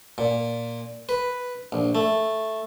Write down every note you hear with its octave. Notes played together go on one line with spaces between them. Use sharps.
A#2
B4
A#1
A3